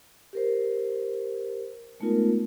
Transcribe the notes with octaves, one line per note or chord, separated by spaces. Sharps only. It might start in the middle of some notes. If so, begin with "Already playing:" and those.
G4 A#4 C5
G#3 A3 B3 D#4 F4 A#4